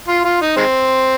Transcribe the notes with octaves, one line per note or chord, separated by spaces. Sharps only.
F4
F4
D#4
D#3 G#3 C4